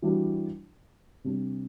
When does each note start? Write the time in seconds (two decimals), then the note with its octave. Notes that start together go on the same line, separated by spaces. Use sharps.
0.02 E3 G3 D4 F#4
1.24 C3 G3 D4